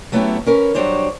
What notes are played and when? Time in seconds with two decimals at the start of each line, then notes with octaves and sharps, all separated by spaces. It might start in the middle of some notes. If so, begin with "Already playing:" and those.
0.12 F#3 A3 B3 C#4 E4 G4
0.46 C#4 A#4 B4
0.75 F#3 G3 D4 C5 C#5